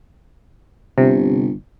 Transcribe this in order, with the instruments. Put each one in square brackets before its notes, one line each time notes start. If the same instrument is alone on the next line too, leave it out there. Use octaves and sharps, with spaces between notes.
[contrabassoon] G1 [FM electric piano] C3